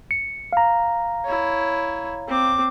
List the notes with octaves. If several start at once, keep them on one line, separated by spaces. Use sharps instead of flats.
C#7
F5 A#5
E4 C#5
C4 D6